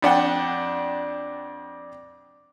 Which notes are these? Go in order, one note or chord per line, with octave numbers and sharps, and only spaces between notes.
F2 D4 F#5 G5